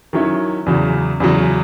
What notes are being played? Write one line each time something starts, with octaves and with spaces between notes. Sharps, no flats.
D#3 F#3 C#4 E4
E2 C#3 F#3
E2 C#3 F#3